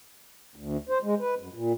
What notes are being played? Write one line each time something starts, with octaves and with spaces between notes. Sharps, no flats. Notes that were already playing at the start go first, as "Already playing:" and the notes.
D2
C5
G#3
B4
F#2
A#2